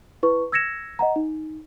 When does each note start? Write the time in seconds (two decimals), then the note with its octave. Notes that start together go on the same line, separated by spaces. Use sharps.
0.23 E4 B4 C#6
0.52 E6 G#6 A#6 C#7 E7
0.99 D#5 F#5 A#5
1.16 D#4